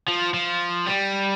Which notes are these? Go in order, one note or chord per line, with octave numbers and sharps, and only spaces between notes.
F3
F3
G3